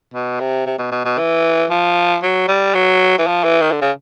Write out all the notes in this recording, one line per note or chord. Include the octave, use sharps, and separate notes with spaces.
B2
C3
C3
B2
B2
B2
E3
F3
F#3
G3
F#3
E3
F3
E3
D#3
D3
C#3